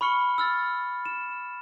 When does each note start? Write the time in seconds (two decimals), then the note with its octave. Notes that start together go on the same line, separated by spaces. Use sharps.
0.01 B5 C#6 F6 C#7 G7
0.38 E6 F6 A6
1.06 E7